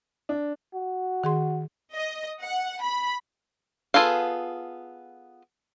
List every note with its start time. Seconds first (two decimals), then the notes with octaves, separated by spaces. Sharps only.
0.29 D4
0.74 F#4
1.24 D#3 G#4 C6
1.93 D#5
2.41 F#5
2.81 B5
3.94 B3 F4 G#4 A4 F5